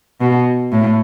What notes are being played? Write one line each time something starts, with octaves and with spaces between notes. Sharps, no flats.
B2
A2